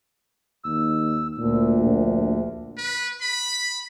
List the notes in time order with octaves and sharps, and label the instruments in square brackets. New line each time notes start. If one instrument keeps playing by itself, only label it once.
[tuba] D#2 [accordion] E6
[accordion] D2 [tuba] A#2
[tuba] A#1
[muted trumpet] B4
B5